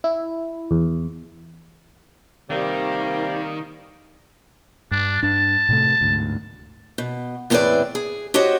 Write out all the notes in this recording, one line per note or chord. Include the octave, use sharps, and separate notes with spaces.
E4
E2
C3 D#3 G3 A#3
G2 D4
G2 D4 A5
A2 C3 A3
D2 G#2
B2
E2 A2 C4 G#4 B4 D5
G#4
F#4 G4 C5 C#5 D#5 F#5